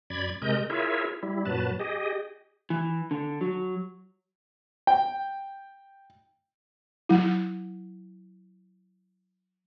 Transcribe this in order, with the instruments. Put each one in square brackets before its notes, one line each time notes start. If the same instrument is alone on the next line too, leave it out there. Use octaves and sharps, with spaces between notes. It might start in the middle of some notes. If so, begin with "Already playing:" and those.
[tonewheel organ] F#2 D5 B5 G#6
C3 G#3 A#4 D#5 G6
E4 F4 G#4 A#4 C#5 E5
G3 E4
F#2 A#2 F#3 B4 A5
G4 G#4 D#5
[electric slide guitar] E3
D3
F#3
[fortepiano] G5
[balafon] F#3 E4